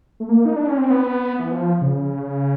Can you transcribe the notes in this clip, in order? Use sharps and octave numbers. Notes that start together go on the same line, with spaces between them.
A3
A#3
D#4
D4
C#4
C4
B3
E3
F3
C#3